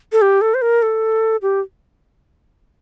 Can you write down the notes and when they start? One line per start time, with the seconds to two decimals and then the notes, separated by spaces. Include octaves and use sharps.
0.12 A4
0.22 G4
0.41 A4
0.54 C5
0.62 A#4
0.82 A4
1.42 G4